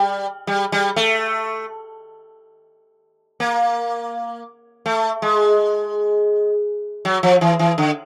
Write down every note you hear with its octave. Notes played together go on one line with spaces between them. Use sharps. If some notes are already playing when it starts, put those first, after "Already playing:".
Already playing: G3
G3
G3
A3
A#3
A3
G#3
F#3
F3
E3
E3
D3